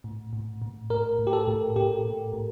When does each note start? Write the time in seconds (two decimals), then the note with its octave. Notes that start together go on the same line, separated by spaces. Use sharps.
0.04 A2
0.33 A2
0.62 A2
0.90 A2 A#4
1.19 A2
1.27 G4
1.33 A4
1.47 A2
1.76 A2 G4
2.05 A2
2.33 A2